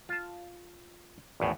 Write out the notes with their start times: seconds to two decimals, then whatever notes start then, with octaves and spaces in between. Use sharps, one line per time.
0.09 F4 A5
1.40 G#1 E2 A2